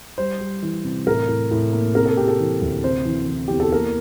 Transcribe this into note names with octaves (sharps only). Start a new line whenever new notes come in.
G3 C5
G3
E3
C3
A2 A#4
A2
A2
A#3
C3 A#4
A4
C3 G4
A4
E3
D2
C3 C5
E3
E3
E2 G4
A4
A#3 A#4